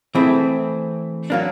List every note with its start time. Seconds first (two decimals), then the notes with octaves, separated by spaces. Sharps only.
0.15 E3 A3 C4 E4 G#4
1.30 F#3 A#3 D4